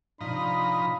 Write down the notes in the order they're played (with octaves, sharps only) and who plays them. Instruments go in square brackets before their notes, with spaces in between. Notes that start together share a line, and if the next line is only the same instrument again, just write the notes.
[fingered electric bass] A2 C3 [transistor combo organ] F3 D#4 A#5 [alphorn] D4 [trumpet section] B5